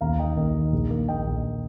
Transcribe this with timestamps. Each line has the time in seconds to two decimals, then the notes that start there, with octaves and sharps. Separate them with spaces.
0.01 D#2 F5 A#5
0.19 D#3 D#5 G5
0.36 D#2 A#4 D#5
0.55 D#3
0.72 A#1
0.90 A#3
1.08 A#1 D#5 G5
1.27 A#1